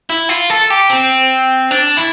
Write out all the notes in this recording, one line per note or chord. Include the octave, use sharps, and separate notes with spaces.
E4
F4
A4
G4
C4
D4
E4